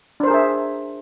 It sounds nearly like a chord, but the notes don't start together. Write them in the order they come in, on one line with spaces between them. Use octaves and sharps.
D4 C5 A#4 G#4 E5